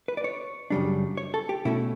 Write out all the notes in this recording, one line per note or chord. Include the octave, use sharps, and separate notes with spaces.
B4
D5
C#5
F#2 C#3 G3 D4
C#5
A4
G4
B2 A3 C#4 E4